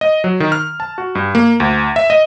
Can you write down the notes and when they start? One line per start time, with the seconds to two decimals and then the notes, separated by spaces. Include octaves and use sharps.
0.01 D#5
0.24 F#3
0.40 D#3
0.52 F6
0.80 A5
0.98 F#4
1.15 G2
1.35 A#3
1.60 D2
1.96 E5
2.10 D#5